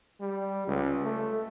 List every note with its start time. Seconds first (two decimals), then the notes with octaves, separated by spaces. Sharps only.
0.21 G3
0.67 C#2
1.04 A3